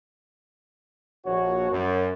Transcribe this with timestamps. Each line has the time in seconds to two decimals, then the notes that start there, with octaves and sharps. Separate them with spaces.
1.25 A#1 F#4 C#5
1.71 F#2